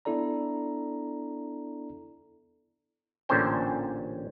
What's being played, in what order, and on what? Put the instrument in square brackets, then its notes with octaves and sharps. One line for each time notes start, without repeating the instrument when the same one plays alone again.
[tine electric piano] B3 D4 E4 A4 D5 A#5
[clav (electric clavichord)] A1 A#2 D3 C#4 C5 G5